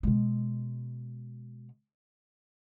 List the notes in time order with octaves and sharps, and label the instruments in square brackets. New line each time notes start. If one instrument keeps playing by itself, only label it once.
[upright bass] B2 G#3